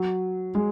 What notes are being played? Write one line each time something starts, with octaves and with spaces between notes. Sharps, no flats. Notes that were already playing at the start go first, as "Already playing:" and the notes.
Already playing: F#3
G#3